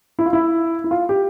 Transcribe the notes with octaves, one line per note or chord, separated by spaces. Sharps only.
E4
F4
E4
E4
F4
G4